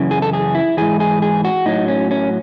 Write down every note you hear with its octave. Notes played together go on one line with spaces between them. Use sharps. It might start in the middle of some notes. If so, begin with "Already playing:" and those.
Already playing: F#2 C#3 E3
G#4
A4
G#4
E4
G#2 E3 G#4
G#4
G#4
F#4
A2 F#3 D#4
C#4
C#4